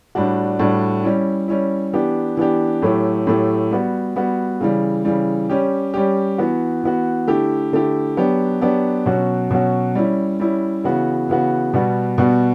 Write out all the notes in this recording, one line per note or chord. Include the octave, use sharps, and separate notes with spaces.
A2 G3 D4 F#4
A2 G3 D4 F#4
G3 C#4 E4
G3 C#4 E4
E3 B3 D4 G4
E3 B3 D4 G4
A2 F#3 A3 E4 G4
A2 F#3 A3 E4 G4
G3 B3 F#4
G3 B3 F#4
C#3 E3 G3
C#3 E3 G3
G3 C#4 G4
G3 C#4 G4
E3 B3 F#4
E3 B3 F#4
D3 A3 E4 G4
D3 A3 E4 G4
F#3 B3 D4 G4
F#3 B3 D4 G4
B2 F#3 C#4 F#4
B2 F#3 C#4 F#4
G3 C#4 E4
G3 C#4 E4
C#3 E3 B3 F#4
C#3 E3 B3 F#4
B2 G3 B3 F#4
B2 G3 B3 F#4